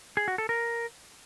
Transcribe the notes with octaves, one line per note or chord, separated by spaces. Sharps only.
G#4
F#4
A4
A#4